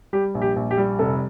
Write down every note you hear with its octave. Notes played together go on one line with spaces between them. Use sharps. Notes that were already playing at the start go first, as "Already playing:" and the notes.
G3 G4
A#1
G4
A#1
G4
G3
F1 A4